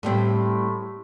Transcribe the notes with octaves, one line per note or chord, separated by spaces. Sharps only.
A2 G3 C4